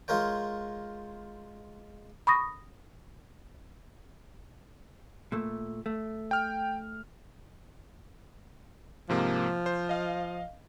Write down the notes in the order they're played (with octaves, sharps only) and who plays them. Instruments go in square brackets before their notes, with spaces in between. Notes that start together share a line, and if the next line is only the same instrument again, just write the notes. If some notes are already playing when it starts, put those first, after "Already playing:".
[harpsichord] G#3 F4 A#4 C#5 G5
[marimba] B5 C#6 D#6 A#6
[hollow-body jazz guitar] A#2 A3
A3
[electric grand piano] G5 F6
[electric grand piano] G#2 C3 A#3 [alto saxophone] F3
[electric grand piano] C5
D#5 F5